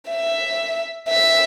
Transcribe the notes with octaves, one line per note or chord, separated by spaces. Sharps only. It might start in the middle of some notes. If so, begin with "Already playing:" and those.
E5
E5